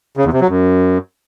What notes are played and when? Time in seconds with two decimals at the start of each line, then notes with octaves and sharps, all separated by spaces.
0.17 C#3
0.25 E2
0.33 C3
0.41 F#3
0.49 F#2